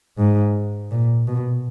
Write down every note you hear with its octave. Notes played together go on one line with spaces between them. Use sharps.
G#2
A#2
B2